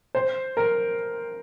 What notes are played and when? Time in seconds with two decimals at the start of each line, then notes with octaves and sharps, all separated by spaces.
0.15 C5
0.57 A#4